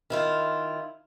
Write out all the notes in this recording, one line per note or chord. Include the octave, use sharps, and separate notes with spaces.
D#3 E4 F4